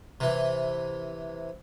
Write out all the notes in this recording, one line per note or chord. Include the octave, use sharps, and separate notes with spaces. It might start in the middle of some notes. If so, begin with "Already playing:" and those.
C3 E3